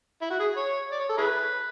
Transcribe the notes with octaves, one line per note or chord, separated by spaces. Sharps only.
E4
F#4
G#4
C#5
D5
C#5
A4
E4 G#4 B4